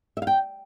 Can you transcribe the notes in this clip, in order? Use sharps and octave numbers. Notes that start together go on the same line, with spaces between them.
E5
F5
G5